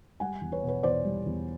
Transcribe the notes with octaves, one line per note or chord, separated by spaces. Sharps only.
G3 F#5 G#5
E2
B4 C#5
B2
B4 C#5
E2 C5 D5
G3
E2